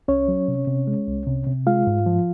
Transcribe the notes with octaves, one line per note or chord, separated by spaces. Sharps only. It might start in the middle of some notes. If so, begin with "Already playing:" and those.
C2 C#4 C#5
F#3
C3
C3
G#3
C2
C3
C3
G#3 F4 F5
G#2
F3